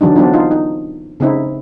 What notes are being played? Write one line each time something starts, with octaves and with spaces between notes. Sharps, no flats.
D3 E3 F#3 D4 D#4
F#3 B3 C4 D4 D#4 F4
D#4 F4
D#4
C#3 C4 D#4 E4